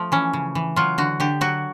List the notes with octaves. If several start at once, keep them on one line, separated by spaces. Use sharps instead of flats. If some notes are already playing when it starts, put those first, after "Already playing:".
Already playing: F3 A3
E3 C#4
C#3
E3
F#3 F4
D3 F#4
D3 G4
F#3 F#4